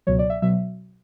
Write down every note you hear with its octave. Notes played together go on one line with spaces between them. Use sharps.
C#2 B2 F#3 C#5
D5
E5
B2 F#3 E5